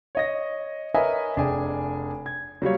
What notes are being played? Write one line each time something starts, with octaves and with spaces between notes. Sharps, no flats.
C#5 D#5 A#6
A#4 B4 C#5 D#5 E5 G#5
F1 D4 G#4 G5 G#5
G#6
F#3 G3 A#3 C#5